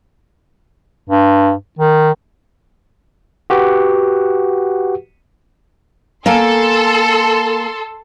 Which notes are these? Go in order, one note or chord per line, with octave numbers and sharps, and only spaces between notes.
G2
D#3
F#4 G4 B4 F#5
A#3 A4 G#5 C6